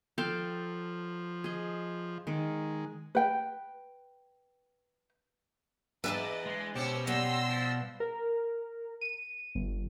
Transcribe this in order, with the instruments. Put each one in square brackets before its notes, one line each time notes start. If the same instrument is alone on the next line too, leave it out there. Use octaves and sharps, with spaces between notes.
[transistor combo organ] F3 [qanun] A4 F5 G5
[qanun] G#4 D#5
[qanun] D#3 [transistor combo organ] G#3
[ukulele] B4 G5
[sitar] E2 D4 E5 [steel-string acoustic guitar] B4 G#5 A5 [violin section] D#5
[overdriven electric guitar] G#3
[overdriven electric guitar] B2 [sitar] C#4 G4 [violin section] C5 E6 C#7
[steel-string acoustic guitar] G3 B3 [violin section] C6 E6 A#6
[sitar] F3
[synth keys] A#4
D#7
G1